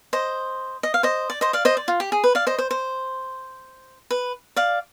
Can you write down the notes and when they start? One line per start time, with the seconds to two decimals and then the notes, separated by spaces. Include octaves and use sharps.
0.13 C5 D#5
0.83 D#5
0.94 F5
1.03 C5 D#5
1.30 D5
1.41 C5 D#5
1.53 D5 F5
1.65 C5 D#5
1.77 D5
1.88 F4
2.00 G4
2.12 G#4
2.24 B4
2.35 D5 F5
2.47 C5 D#5
2.58 C5
2.71 C5
4.11 B4
4.56 D5 F5